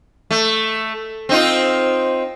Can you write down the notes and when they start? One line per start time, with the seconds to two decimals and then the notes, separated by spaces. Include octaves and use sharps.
0.31 A3
1.29 C4 D#4 F4